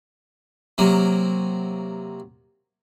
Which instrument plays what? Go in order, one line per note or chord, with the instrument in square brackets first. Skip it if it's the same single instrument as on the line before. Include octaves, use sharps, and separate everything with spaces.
[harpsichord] C3 F#3 A#3